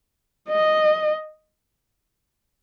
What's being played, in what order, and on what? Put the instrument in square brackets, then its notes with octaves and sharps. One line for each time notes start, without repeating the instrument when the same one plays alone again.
[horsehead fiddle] D#5